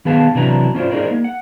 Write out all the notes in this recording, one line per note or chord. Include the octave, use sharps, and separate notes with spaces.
D#3 B3 G#4 B4 F5 A5
C3 E3 F#3 D4 B4 A#5
C#4 F4 C5 D5
D#4 G#4 A#4 C5 D5
A#3
F#5